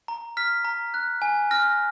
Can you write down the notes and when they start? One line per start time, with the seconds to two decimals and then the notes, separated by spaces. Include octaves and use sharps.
0.08 A#5
0.37 F6 B6
0.65 A#5
0.94 F#6
1.22 G#5
1.51 F6 A#6